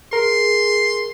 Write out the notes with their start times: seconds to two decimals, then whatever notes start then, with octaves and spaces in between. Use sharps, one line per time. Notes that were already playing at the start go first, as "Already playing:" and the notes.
0.13 G#4 A#4 C6